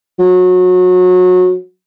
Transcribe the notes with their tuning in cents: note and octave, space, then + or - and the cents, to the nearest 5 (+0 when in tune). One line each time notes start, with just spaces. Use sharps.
F#3 -25